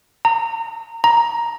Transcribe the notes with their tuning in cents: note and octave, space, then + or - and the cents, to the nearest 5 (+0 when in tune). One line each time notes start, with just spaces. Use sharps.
A#5 -25
A#5 +10